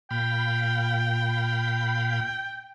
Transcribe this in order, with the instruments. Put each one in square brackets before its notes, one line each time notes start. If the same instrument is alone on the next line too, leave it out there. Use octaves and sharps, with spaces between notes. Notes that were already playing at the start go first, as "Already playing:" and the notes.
[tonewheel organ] A#2 F5 B5 [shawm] G5